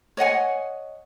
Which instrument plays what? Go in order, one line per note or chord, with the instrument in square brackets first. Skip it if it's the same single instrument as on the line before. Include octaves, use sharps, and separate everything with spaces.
[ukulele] C#5 D#5 F#5 G#5